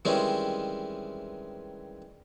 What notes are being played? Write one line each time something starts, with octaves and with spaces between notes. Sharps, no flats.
D#3 E3 G3 G#3 C4 C#4